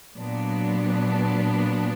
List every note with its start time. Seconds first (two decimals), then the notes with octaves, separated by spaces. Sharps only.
0.17 A#2 F#3 B3 D4